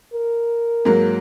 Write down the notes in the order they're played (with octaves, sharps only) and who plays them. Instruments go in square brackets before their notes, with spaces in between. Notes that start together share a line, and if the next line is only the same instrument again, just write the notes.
[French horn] A#4
[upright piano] G#2 F#3 A#3